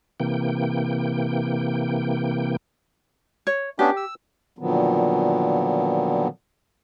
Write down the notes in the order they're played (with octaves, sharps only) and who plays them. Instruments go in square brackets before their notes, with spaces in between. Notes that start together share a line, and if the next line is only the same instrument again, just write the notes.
[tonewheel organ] C3 E3 A#3 G5
[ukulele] C#5
[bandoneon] B3 C#4 D4 [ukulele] G4
[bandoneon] E6
[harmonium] A#2 D3 D#3 F3 F#3 B3